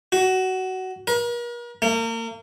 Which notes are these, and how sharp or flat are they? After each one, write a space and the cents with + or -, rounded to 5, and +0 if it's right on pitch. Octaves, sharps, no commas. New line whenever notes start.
F#4 +15
A#4 +40
A#3 -35